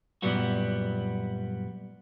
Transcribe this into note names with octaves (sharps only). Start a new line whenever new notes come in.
F#2 A#2 F#3 G3 B3 F#4